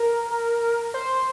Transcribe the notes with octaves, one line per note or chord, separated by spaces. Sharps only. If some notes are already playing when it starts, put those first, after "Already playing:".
Already playing: A#4
C5